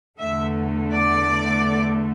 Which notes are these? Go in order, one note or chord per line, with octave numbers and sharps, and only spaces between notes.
E2 D3 A3 E5
D5